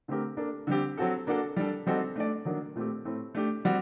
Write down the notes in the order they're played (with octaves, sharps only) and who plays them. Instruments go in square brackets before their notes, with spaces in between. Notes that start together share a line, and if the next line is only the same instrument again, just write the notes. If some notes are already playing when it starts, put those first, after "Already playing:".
[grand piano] D3 A3 C4 G4 A#4
A#3 D4 A4
D3 G3 C4 G4
F#3 C4 F#4 A4
A#3 D4 F#4 A4
G3 D4 A4
G3 C4 D#4 F#4 A4
A3 D4 A4 D5
D#3 F#3 A#3 D4
A#2 A3 C4 G4
A2 A3 C4
A3 D4 G4
G3 C4 F#4